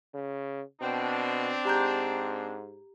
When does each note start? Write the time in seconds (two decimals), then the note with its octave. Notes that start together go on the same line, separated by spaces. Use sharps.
0.14 C#3
0.81 B2 C4 D4
1.65 G#2 G4 A#5 G6